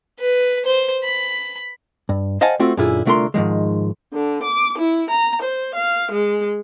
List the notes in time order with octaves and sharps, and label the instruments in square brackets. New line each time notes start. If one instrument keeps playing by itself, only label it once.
[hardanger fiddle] B4
C5
B5
[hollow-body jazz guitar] G2
C5 D#5 F5 F#5 G#5 A5
A3 C4 F4 F#4
F#2 A#2 D3 E4 F4 G#4
C2 D3 A3 F4 A#4 C6
G#2 D#3 F3 G#3
[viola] D3
D6
E4
A#5
C5
F5
G#3